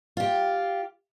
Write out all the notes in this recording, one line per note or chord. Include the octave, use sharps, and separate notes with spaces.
F4 G4